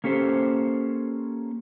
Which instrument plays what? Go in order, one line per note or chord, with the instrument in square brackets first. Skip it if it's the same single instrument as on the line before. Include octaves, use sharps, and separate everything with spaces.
[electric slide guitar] A#3 C#4 G4 A4 C5